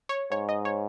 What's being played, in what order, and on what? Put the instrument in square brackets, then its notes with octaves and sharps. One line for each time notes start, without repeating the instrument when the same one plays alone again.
[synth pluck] C#5
[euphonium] G#2 [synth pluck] C#5
[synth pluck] D#5
C#5